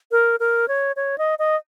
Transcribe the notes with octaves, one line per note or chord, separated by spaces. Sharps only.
A#4
A#4
C#5
C#5
D#5
D#5